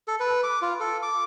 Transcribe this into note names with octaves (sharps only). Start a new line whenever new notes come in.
A4
B4
D6
F4
A4
D6